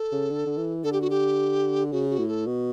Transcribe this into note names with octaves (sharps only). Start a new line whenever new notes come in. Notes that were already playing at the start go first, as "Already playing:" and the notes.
Already playing: A4
C#3
D3
D3
E3
D3 A4
G4
F#4
G4
C#3 F#4
F#4
A2
A4
B2